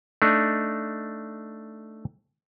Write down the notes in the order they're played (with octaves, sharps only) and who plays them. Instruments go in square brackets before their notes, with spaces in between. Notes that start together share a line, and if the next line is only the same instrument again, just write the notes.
[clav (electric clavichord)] A3 D4 D#4